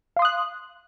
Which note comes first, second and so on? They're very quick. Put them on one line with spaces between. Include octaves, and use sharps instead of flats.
F5 C6 D#6 F#6